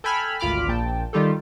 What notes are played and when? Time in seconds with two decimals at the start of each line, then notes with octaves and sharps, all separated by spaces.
0.04 A4 G5 G#5 B5 E6 F6
0.40 G#1 D2 F4 B5 D6 F6
0.68 A#1 A#2 G5 A5
1.13 D#3 G3 F4 G4 A4